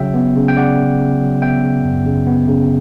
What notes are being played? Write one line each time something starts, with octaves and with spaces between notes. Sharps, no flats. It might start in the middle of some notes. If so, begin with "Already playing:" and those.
Already playing: C#3 F#3 E5 G5
B3
C#3
G5
C#3 D5 F#5
C#3
C#3
F#3
B3 E5 G5
C#3
F#2
C#3
B3
C#3